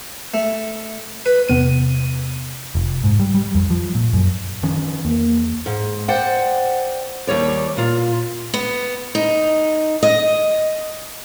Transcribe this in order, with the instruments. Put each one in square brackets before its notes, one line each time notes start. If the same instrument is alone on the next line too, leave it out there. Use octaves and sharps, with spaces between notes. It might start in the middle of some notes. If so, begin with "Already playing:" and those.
[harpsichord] A3
B4
[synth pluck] E2 C3 B3 D#7
[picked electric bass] F1
G#2
G3
G3
F2
F3
A#2
F#2
D#3 F3 C#4
[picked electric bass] E2 [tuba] A#3
[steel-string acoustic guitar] G#2
C5 D5 F#5 G5
D#2 G3 C#5 D5
A#2 F4
B3
D#4
D#5